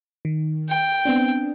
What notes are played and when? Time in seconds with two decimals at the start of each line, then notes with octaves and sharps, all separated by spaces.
0.25 D#3
0.69 G5
1.05 B3 C4 D4